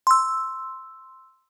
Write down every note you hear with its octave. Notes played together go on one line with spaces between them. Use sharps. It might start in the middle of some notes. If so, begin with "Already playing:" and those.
C6 E6